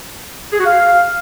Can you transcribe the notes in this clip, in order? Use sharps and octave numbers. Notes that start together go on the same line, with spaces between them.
G#4
F#4
F5